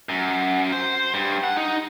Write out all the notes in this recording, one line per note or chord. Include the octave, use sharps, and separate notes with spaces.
F#2
C5
G2
F#5
D#4